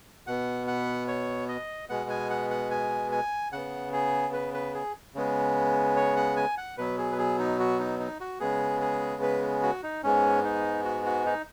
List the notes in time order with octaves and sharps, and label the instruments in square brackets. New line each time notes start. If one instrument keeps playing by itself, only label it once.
[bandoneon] B2 B3 F#5
F#5
C#5
D#5
B2 G#3 B3 F#5
G#5
F#5
F#5
G#5
G#5
C#3 B3 F#5
G#4
B4
B4
G#4
C#3 G#3 B3
C#5
F#5
G#5
F#5
B2 F#3 B3 B4
G#4
B4
G#4
D#4
F#4
D#4
D#4
F#4
C#3 G#3 B3 G#4
G#4
B4
F#4
D#4
G#2 G#3 B3 C#4
D#4
F#4
F#4
D#4